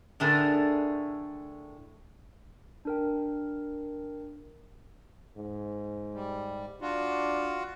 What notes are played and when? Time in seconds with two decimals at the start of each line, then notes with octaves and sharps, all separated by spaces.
0.20 A2 D3 A3 D4 G#4 A#4
2.85 D4 A#4 G5
5.37 G#2
6.14 G3
6.81 D4 F4 F#4